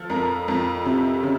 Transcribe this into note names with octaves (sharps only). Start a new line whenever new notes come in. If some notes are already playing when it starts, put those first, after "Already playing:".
Already playing: F3 A4
F2 A#4
F2
C3
C#3